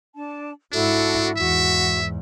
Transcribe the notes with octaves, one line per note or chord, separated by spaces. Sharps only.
D4 A5
G#2 D4 E4 F#4 A4
E2 G#2 F#4 E5